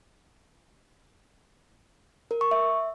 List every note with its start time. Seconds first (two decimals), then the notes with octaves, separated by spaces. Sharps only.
2.31 A#4
2.41 C#6
2.51 E5